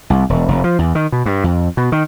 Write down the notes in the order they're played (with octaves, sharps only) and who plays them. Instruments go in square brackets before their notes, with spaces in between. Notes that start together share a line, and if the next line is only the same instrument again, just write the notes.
[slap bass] C2
E1
F1
F3
E2
D#3
B2
G2
F2
B2
D#3